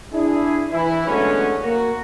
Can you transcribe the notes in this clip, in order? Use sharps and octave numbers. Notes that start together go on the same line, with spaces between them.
D4 E4 G#4
E3 E4
D3 F#3 G#3 A3 B3 C#4
A#3 F#4